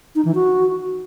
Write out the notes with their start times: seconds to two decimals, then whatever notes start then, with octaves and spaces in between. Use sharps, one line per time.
0.15 D#4
0.25 E3
0.35 F#4